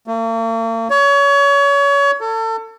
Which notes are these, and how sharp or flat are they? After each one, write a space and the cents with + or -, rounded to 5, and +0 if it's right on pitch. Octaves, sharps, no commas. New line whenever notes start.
A#3 -45
C#5 +30
A4 +30